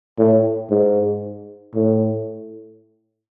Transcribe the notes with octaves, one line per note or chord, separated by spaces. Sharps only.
A2
G#2
A2